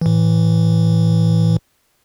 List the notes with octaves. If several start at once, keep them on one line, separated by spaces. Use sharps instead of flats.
A2 E3